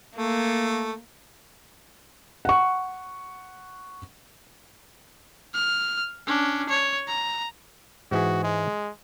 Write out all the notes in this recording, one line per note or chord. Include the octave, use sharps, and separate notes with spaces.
A3 A#3
F#5 C#6
F6
C#4 D4
C#5
A#5
G#2 E3 F#4 G#4
G#3